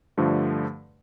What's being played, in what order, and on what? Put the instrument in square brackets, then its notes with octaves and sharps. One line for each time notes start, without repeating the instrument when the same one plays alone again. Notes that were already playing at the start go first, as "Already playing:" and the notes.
[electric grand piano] G2 D3 F3 A3